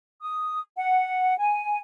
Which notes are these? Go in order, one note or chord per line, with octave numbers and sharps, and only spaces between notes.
D#6
F#5
G#5